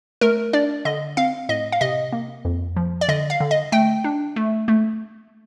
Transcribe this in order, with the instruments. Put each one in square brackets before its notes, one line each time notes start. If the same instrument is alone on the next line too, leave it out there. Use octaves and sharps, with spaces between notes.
[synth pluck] A3 A#4
D4 D5
D3 D#5
C4 F5
A2 D#5
F5
C3 D#5
A#3
F2
F3
D5
D3 D#5
F5
D3
D#5
A3 G5
D4
A3
A3